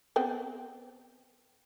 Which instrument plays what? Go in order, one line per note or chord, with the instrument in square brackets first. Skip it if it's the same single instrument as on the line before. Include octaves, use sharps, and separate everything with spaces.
[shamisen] B3 C4 G5